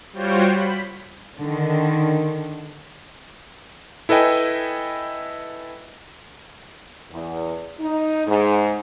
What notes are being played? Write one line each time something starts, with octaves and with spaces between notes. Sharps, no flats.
G3 F4 F#4 C5 C#5 G5
B5
D3 D#3
E4 A4 B4 D#5 G5 G#5
E2
D#4
G#2